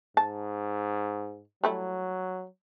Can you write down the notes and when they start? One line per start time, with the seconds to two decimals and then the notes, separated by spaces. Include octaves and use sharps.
0.17 G#2 A5
1.64 F#3 G3 A3 E4